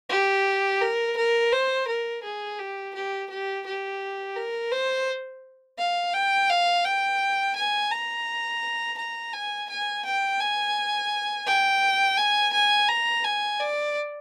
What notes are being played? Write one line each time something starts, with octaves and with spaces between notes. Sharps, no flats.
G4
A#4
A#4
C5
A#4
G#4
G4
G4
G4
G4
A#4
C5
F5
G5
F5
G5
G#5
A#5
A#5
G#5
G#5
G5
G#5
G5
G#5
G#5
A#5
G#5
D5